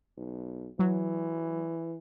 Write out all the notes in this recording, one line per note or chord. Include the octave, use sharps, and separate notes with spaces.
B1
E3 F#3